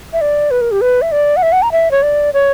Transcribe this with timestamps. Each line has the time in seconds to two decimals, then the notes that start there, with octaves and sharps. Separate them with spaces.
0.13 E5
0.21 D5
0.51 B4
0.61 A#4
0.71 G4
0.81 B4
1.02 E5
1.12 D5
1.37 F#5
1.43 E5
1.52 F#5
1.62 A#5
1.72 E5
1.91 C#5
2.03 D5
2.34 C#5